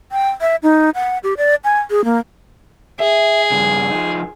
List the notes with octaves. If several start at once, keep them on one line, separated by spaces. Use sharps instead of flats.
G5
E5
D#4
F#5
G4
D5
G#5
G#4
A#3
G#4 E5
G2 C#3
F3 D#4